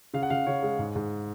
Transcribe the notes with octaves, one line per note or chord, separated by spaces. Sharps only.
C#3 F5
F#5
C#3 F5
C#3 C#5
G#3
G#2
G#2